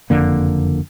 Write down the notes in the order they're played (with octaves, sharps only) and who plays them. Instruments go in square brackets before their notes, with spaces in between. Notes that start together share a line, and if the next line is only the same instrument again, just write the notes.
[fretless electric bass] F#1 F2 D3 A#3